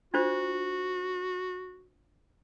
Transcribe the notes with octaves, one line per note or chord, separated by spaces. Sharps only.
D4 F4 F#4 C5